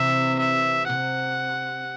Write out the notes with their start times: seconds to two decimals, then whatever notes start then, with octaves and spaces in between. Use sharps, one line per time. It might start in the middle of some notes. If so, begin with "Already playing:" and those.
Already playing: C3 E3 E5
0.39 E5
0.89 C3 F#5